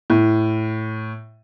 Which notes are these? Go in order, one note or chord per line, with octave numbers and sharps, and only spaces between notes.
A2